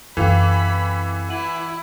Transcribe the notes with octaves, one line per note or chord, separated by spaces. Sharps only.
F#2 E3 C4 A4 F5 G5 B5
E4 F#5 D#7 F#7